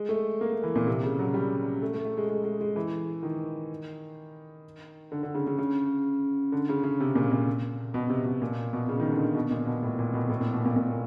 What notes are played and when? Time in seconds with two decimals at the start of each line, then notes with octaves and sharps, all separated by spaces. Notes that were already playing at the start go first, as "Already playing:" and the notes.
Already playing: G#3
0.09 A3
0.41 A#3
0.52 A3
0.63 E3
0.75 A#2
0.87 C3
1.04 C#3
1.19 F#3
1.34 G3
1.82 A3
1.94 A3
2.05 A3
2.17 G#3
2.29 G#3
2.44 G#3
2.61 G#3
2.76 E3
3.23 D#3
5.12 D3
5.23 D3
5.34 C#3
5.47 C#3
5.58 C#3
6.52 D3
6.69 C#3
6.83 C#3
7.00 C3
7.15 A#2
7.32 A#2
7.94 B2
8.10 C3
8.25 B2
8.42 A#2
8.73 B2
8.89 C#3
9.00 D#3
9.11 D3
9.24 C#3
9.35 B2
9.51 A#2
9.66 B2
9.83 A2
9.99 A#2
10.14 B2
10.29 A2
10.41 A#2
10.53 B2
10.65 A#2
10.76 A#2